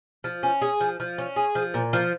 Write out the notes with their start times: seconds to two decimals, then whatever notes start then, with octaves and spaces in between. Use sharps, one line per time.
0.24 F3
0.43 C#4
0.61 G#4
0.80 F3
1.00 F3
1.18 C#4
1.36 G#4
1.55 F3
1.74 A#2
1.93 F3